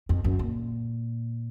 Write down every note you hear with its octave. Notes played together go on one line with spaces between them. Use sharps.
F2
F#2
A#2